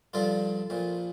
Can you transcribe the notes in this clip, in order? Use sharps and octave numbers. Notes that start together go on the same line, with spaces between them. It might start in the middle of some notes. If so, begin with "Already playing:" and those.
G2 D3 F3 F4 A4
A#1 A#2 F3